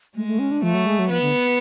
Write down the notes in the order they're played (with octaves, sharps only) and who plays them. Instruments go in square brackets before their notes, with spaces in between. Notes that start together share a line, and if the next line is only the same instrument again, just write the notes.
[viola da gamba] G#3 [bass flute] A3
[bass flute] A3
C#4
D4
[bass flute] F3 [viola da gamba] A3
[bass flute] F#3
G#3
F#3
[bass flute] F3 [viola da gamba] B3
[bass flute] D3